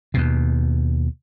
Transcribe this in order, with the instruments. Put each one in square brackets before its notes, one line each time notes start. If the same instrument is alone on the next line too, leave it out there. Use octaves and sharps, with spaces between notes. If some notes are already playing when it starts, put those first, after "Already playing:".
[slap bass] D#2 B2